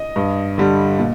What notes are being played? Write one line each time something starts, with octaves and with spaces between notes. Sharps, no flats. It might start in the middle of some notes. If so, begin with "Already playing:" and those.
Already playing: D#5
G2
D3 G3
A#2